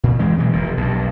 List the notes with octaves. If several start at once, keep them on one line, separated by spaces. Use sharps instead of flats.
A#2
E3 G#3 C4
B2 E3 F#3
F1 A#2
B1 G2